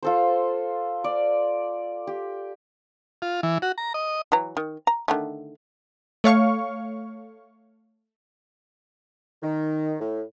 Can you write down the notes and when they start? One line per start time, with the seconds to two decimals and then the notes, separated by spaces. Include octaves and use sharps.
0.03 F4 A4 C5
1.04 D5
2.07 G4
3.22 F4
3.43 E3
3.62 F#4
3.78 A#5
3.94 D#5
4.32 E3 F#3 A#5
4.57 D#3
4.87 A#5
5.08 D3 D#3 A3
6.24 A3 C#5 F5 C#6
9.43 D#3
9.99 A2